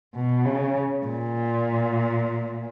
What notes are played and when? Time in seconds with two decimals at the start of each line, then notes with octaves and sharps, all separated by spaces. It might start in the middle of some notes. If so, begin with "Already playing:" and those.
0.15 B2
0.45 C#3
1.06 A#2